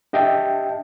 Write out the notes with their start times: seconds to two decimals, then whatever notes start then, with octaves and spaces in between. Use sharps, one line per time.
0.13 D4 G4 D#5 E5 G5 A5